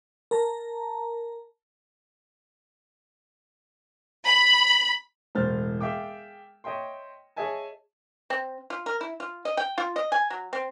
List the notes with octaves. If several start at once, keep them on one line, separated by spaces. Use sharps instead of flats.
A#4 A5 A#5
B5
E1 A2 C5 F6 A6
G#4 E5 F5 G5 D6
C#5 D#5 E5 G5 C6
G#4 C#5 D#5 E5 G#5 A5
C4
F4
A#4
E4
F4
D#5
G5
F4
D#5
G#5
F#3
C4